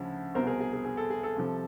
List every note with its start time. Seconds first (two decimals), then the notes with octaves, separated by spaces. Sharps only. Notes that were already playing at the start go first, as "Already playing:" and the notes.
Already playing: D2 C#3 F3
0.34 C2 B2 A#4 C5
0.47 G#4 A#4
0.61 G#4
0.73 G#4
0.85 G#4
0.97 A4
1.10 G#4
1.23 A4
1.36 C2 C3 F3